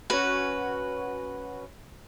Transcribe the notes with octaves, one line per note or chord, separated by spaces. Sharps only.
C#4 F#4 B4